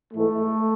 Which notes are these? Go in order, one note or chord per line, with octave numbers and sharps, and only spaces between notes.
G#2 E3 A3